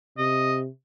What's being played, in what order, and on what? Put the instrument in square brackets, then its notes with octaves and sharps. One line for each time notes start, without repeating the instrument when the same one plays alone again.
[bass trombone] C3 [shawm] D#5